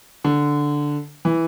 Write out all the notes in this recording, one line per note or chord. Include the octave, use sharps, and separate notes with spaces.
D3
E3